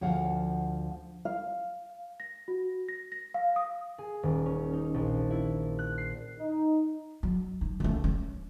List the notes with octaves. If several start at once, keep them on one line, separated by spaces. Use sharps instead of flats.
D2 F3 F5 F#5
F5
A#6
F#4
A#6
A#6
F5
D#6
G#4
D#1
C#4
D#4
A#1
E4
F#6
C7
D#4
F#3
D#4
C#2 A3
C#4